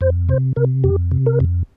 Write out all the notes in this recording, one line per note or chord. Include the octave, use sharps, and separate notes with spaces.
F2 C5
C3 C5
C3 A#4
F2 G4
C3
A#4
F2